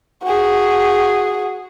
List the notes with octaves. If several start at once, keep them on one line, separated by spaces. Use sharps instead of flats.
F#4 G#4